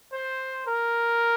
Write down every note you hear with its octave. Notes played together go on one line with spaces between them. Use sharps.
C5
A#4